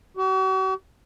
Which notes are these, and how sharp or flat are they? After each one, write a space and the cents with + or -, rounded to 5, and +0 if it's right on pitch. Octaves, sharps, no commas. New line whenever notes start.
F#4 +45